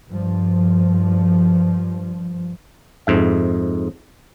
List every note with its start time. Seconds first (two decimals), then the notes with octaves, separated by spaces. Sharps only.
0.11 G2 F3
3.07 F2 G#2 E5